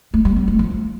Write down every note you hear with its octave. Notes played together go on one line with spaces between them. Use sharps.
A3
G3
B3
A3
F3